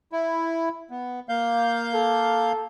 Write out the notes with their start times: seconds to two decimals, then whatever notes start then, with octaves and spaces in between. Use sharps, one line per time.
0.12 E4
0.90 B3
1.29 A#3 F5 G6
1.94 A4